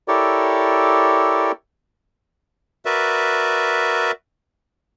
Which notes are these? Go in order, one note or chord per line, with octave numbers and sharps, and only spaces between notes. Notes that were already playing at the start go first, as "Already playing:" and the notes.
E4 G4 A4 A#4 C#5 D5
F#4 A#4 B4 D5 E5